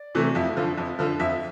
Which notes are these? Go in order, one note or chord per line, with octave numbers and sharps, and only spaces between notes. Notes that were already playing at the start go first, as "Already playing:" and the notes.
Already playing: D5
C3 E3 A3
F2 E5
D3 F3
F2
D3 F3
F2 E5